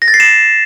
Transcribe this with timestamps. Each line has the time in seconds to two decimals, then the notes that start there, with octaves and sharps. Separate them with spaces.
0.02 A#6
0.08 A6
0.14 C7
0.20 E7